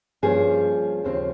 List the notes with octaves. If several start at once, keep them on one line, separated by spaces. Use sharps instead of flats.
G2 F3 A#3 C#4 G#4
D#2 C#3 F3 C4